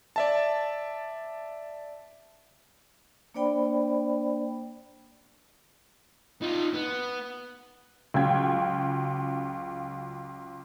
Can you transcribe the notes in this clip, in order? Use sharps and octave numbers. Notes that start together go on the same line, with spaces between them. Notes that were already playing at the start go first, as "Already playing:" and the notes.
D5 E5 A5
A#3 D4 C5 D5 G5 B5
D#4 F4
B3
C#2 C#3 F#3 G5 G#6